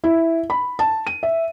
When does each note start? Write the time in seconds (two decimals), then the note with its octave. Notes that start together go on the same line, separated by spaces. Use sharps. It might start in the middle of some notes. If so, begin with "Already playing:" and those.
0.04 E4
0.50 B5
0.79 A5
1.07 D#7
1.23 E5